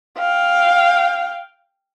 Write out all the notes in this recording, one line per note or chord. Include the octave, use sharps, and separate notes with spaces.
F5 G5